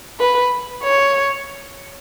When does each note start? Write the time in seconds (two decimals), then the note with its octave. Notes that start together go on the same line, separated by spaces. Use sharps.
0.20 B4
0.83 C#5